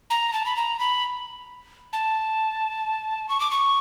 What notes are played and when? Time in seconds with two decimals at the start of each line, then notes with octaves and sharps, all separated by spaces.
0.10 A#5
0.33 A5
0.46 B5
0.56 A#5
0.79 B5
1.93 A5
3.29 C#6
3.40 D6
3.51 C#6